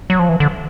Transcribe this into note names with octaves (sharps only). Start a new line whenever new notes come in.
F#3
F3
E3
D3